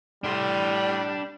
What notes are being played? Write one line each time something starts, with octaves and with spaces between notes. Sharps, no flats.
A2 G3 D4 C6